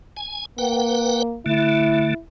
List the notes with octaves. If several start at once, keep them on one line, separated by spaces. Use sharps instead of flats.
G#5
A#3 B4 F#5 G5
D3 A3 E4